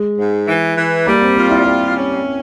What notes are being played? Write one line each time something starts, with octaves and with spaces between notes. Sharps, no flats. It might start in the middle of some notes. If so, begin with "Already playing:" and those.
Already playing: G#3
G#2
E3
E3
G3 A#3
C4
C4 F4
E4
G3 G4
C#4